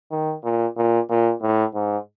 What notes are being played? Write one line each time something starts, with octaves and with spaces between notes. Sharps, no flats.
D#3
A#2
A#2
A#2
A2
G#2